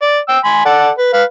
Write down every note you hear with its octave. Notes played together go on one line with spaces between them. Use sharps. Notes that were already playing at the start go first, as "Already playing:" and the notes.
D5
G5 E6
G#5 B5 C6
A4 D5 F#5
B4
B4 F5